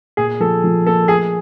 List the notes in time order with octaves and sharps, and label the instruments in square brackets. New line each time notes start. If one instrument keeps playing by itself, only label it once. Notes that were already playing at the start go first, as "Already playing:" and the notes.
[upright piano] A#2 [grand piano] G#4
[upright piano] F3 [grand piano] A4
[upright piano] F3
[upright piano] A#3 [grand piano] A4
[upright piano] A3 [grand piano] G#4